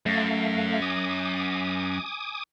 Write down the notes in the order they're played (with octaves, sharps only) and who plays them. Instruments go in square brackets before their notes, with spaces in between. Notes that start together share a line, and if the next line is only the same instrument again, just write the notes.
[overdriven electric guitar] F#2 [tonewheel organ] A3 F5
[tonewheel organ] G#5 D6 D#6